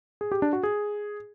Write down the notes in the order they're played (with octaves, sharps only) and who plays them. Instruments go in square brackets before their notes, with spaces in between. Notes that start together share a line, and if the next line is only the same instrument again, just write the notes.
[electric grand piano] G#4
G4
D4
F#4
G#4